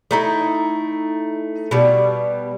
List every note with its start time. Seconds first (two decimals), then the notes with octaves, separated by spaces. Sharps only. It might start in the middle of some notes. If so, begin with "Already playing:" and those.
0.11 A3 D#4 E4
1.71 B2 G3